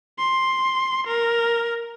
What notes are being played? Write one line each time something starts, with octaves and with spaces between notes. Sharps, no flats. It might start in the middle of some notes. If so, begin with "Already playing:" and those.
C6
A#4